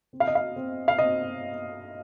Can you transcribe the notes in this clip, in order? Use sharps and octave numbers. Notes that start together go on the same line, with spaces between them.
C4
F5
D#5
F5
C4
F5
C4 D#5